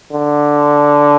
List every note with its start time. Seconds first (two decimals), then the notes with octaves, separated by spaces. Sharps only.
0.13 D3